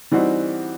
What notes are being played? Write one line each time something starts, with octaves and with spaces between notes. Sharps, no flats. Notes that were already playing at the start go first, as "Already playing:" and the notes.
E3 G3 C4 D#4 F#4